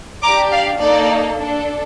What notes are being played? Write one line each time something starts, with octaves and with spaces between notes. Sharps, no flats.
D4 G4 A#5 D6
D5 F5
A#3 D#4 A4 D5
D4 A4